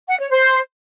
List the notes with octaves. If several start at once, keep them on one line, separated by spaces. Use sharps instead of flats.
F#5
C#5
C5